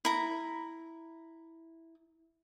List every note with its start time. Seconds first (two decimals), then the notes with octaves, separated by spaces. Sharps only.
0.05 E4 A#5